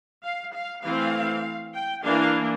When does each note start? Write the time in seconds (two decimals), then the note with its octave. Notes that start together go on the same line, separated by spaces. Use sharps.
0.23 F5
0.54 F5
0.83 E3 A3 C4 F5
1.75 G5
2.05 E3 A#3 D4 F5